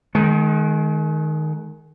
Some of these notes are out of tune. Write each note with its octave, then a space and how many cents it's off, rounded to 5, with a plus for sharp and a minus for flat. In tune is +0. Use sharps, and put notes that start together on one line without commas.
D#3 +0 G#3 +35